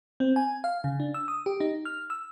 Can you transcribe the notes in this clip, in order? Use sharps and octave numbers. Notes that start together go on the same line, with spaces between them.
C4
G#5
F5
C#3
D4
E6
D#6
G4
D#4
F6
E6